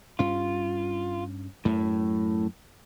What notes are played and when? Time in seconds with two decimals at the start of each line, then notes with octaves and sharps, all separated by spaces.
0.19 G2 C#4 F4
1.65 F#2 A2